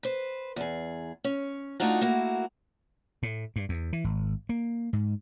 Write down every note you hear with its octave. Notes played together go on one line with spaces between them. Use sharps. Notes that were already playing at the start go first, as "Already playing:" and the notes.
B4 C5
E2 G#4
C#4
A3 D4 D#4 F4 F#4
A3 A#3 E4 F#4
A2
G2
E2
E3
G#1
A#3
G#2